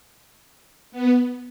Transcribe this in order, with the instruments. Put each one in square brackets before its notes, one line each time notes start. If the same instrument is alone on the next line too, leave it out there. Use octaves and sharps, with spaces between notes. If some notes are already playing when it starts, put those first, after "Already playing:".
[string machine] B3